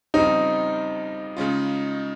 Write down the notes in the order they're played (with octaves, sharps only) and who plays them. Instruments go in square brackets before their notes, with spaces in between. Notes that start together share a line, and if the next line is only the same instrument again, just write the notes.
[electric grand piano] F2 C#3 G3 C4 [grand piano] D#4
[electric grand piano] C#3 G#3 C#4 F4